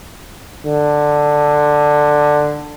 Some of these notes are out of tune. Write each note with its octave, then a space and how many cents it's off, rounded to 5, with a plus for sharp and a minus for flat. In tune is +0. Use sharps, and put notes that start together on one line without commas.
D3 +10